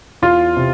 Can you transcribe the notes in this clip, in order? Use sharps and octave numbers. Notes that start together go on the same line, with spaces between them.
E2 F4
C3